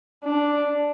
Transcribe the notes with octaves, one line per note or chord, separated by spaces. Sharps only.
D4